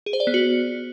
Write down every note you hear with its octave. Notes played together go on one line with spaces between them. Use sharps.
G#4
C5
D5
B3
F#4